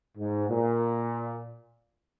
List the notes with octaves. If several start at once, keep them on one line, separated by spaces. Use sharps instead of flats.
G#2
A#2